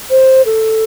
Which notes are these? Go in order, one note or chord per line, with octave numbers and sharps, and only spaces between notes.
C5
A4